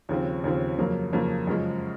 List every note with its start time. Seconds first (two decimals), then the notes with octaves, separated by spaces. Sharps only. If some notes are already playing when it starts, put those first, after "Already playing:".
0.09 D#2 C#3 F3 C4
0.44 D#2 C#3 F3 C4
0.78 F2 C#3 F#3 A#3
1.13 F2 C#3 F#3 A#3
1.47 F#2 C#3 F3 G#3